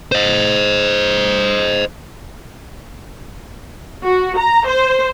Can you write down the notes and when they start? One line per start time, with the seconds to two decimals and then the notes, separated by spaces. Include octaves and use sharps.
0.12 C5 D#5
4.04 F#4
4.37 A#5
4.67 C5